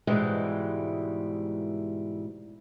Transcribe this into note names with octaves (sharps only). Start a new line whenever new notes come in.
G#2 B2 E3 G3 G#3